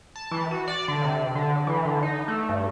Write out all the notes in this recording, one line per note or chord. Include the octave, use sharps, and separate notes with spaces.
A5
E3
F#4
D5
D3
C3
D3
E3
D3
D#4
A3
G2